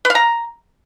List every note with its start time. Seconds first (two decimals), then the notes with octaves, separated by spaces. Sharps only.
0.05 B4
0.10 F5
0.15 A#5